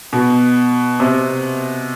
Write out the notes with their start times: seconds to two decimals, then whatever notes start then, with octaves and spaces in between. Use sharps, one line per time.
0.13 B2
1.00 C3